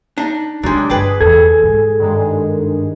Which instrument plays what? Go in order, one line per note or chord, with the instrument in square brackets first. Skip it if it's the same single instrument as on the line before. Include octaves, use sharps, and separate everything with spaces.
[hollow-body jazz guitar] D4 D#4
[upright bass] C3 [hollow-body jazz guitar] F#3 G#3 [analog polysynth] D4 G4
[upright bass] G1 [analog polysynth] G#4 [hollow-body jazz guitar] B4 G5 A5
[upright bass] E2 [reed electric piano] A4 G#6
[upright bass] G#2
[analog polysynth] G2 D#3 G#3